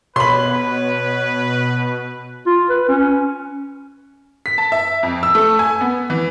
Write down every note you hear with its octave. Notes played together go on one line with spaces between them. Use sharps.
B2 B4 C#5 B5 C6
F4
B4
C#4
B6
A5
E5
F2
E6
A3
G#5
B3
E3